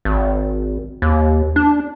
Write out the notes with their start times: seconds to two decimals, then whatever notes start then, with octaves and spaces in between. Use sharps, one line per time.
0.05 G#1
1.02 D#2
1.56 D4